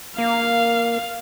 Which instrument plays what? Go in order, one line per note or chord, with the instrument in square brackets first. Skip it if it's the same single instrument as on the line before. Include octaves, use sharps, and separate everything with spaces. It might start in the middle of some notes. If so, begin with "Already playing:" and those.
[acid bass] A#3 [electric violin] F5